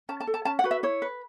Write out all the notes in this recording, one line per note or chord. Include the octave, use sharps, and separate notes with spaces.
C#4 A5
A5
A4
A5
C#4 A5
F#5
F#4 B4
E5
E4 C#5
B4